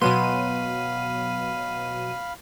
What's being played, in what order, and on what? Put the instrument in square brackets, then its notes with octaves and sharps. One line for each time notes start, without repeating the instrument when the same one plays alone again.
[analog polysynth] B2 F#3 D#7 [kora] B3 [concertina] F5 B5 [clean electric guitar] C6